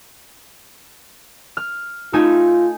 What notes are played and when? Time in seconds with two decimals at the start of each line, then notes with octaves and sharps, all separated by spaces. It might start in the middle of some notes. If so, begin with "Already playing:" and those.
1.57 F6
2.13 A3 D#4 F4 G#5